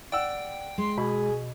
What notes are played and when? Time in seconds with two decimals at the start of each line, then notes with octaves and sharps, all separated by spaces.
0.12 D5 F#5 G5 E6
0.78 G#3 C6
0.98 B2 G#4 B5